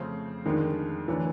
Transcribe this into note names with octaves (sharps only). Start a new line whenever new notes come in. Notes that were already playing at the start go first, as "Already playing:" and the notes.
Already playing: F2 C#3 F3 A3 C4
F2 D3 D#3 F3 G#3
D3 E3 F#3 A3